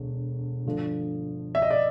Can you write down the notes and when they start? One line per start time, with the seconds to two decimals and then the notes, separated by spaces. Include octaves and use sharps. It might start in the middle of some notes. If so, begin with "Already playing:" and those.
Already playing: E1 D2
0.65 G2 D3 F3 A3
1.55 E5
1.62 D#5
1.71 D5